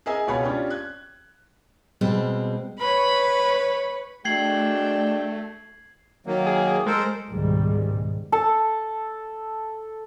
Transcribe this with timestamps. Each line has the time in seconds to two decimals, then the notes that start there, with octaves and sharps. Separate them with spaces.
0.06 G#4 A#4 D#5 E5 G#5
0.27 C#2 B2 C#5 F5 F#5 B5
0.42 C#4 D4 F4 G4
0.70 F#6 G#6
2.01 B2 G3 G#3 C4
2.79 B4 C#5 B5
4.25 G#3 A3 D4 F#4 G5 G#6 C7 F#7
6.26 D#3 F#3 A#3
6.46 G#4
6.86 G#3 A4 A#4 C5
7.30 C#2 G#2 B2 D#3 G3 G#3
8.32 A4 A5